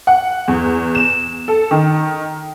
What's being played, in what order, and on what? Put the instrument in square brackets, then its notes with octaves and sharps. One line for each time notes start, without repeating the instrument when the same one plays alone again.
[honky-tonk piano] F#5
E2
E7
A4
D#3